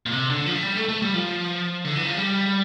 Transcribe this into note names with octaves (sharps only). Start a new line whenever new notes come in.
A#2
C3
D3
F3
A3
G3
A3
A3
G3
F3
D3
E3
F3
G3